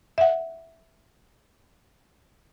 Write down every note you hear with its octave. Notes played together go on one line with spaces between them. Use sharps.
E5 F#5